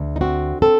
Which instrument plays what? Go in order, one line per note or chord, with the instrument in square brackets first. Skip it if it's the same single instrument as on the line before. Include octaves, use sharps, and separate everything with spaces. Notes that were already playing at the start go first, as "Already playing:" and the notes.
Already playing: [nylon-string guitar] D2
D#4
C4 F#4
C4 A4